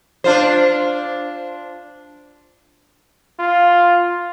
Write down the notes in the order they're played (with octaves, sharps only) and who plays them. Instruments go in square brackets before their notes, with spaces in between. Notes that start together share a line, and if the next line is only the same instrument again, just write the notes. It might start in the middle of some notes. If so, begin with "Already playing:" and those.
[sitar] D4 F4 C5
[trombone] F4